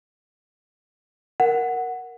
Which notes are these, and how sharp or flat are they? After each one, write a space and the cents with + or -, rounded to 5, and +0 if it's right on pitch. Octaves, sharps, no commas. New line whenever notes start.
A#4 +0 F#5 +0